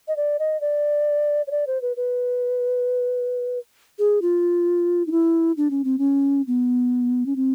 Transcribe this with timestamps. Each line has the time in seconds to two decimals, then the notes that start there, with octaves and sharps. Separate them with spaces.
0.08 D#5
0.17 D5
0.39 D#5
0.61 D5
1.47 C#5
1.51 D5
1.67 C5
1.82 B4
1.97 B4
3.99 G#4
4.22 F4
5.07 D#4
5.12 E4
5.57 D4
5.71 C#4
5.84 C4
5.98 C#4
6.47 B3
7.26 C#4
7.36 C4